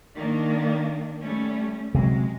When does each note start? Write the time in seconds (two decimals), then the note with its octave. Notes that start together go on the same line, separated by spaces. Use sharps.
0.15 D#3 A#3 D4
1.19 G3 A3 C#4
1.95 C3 F#3 G#3